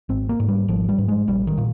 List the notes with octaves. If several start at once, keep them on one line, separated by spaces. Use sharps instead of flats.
G#1 C4
A#3
G#2
G3
G#1 F3
G3
G#2
G#3
A#1 G3
D#3
A#2